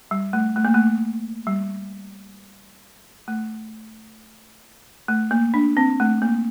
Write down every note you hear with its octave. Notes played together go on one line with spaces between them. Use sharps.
G3
A3
A3
A#3
A3
G3
A3
A3
A#3
D4
C4
A3
A#3